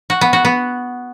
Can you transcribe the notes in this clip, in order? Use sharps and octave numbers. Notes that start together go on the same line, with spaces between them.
F#4
B3
F#4
B3